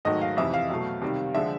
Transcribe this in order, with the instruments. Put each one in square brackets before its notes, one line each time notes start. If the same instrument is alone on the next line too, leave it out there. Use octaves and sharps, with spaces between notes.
[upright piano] G#2 D#3 F#3 A3 D#5
F5
F2 C3 E3 E5
F5
B2 F#3 A3
C3 D#3 G3
D3 F3 G#3 E5